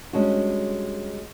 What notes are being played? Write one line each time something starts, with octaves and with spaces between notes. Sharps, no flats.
G3 G#3 C#4 D4 F#4